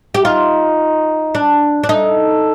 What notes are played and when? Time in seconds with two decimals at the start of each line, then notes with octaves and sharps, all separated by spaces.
0.14 G4
0.25 D#4 F4
1.35 D4
1.84 D4
1.89 D#4 A4